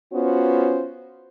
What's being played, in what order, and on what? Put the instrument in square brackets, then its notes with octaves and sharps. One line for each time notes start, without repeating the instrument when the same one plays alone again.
[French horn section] B3 C#4 F4 F#4 C5